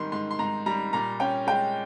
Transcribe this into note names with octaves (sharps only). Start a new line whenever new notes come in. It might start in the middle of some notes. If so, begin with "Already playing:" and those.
Already playing: G#2 D#3 G3 C6
G#2 C6
C6
G#2 A#5
G3 A#5
A#2 A#5
C#4 G5
G#3 G5